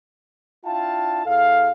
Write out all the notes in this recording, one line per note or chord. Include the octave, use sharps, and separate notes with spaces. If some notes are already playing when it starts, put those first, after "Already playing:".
D4 E4 F4 F5 G5 A5
E2 A4 F5